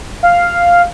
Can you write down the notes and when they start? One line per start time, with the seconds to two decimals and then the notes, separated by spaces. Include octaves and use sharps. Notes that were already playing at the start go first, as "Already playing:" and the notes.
0.23 F5